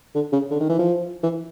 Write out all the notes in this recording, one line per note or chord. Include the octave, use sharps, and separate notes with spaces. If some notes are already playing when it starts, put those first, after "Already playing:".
D3
C#3
D3
D#3
E3
F3
E3